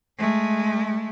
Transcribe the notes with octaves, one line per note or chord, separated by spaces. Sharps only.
G#3 A3